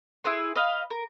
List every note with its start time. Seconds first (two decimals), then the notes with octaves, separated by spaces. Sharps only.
0.24 E4 G#4 B4 C6
0.55 B4 D#5 F5
0.90 A#4